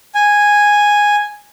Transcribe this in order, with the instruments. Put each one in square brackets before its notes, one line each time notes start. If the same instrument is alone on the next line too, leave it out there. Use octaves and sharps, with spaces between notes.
[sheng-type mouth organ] G#5